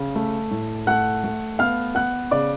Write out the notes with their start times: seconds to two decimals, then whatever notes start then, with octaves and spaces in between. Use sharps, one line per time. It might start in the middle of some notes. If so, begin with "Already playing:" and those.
Already playing: C#3
0.15 A3
0.51 A2
0.87 A3 F#5 F#6
1.24 A3
1.59 B3 F5 F6
1.95 B3 F#5 F#6
2.31 C#3 D5 D6